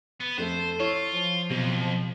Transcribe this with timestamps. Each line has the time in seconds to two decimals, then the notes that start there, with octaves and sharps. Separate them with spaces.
0.20 B3
0.38 F2 A3 A4 C5
0.80 E4 F4 C#5
1.11 F3
1.50 F#1 F2 B2